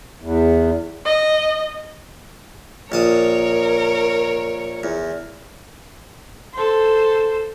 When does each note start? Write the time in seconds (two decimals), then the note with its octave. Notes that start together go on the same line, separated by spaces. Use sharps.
0.22 E2
1.06 D#5
2.92 A#1 A#4 C#5 A5 D#6
4.83 E2
6.54 A4 C5